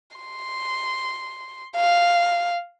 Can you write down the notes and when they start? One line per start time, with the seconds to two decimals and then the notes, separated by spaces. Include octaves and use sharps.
0.17 C6
1.77 F5